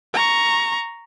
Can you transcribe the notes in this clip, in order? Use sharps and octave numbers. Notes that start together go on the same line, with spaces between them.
A#5 C#6